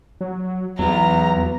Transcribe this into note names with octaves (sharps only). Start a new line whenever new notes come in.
F#3
E2 F#3 B3 A#5